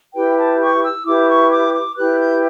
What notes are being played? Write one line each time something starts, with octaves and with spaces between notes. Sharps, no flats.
E4 G4 B4 G5
A5
C#6
E6
E4 G4 B4 D6
C#6
D6
D6
E4 G4 B4 F#6
G6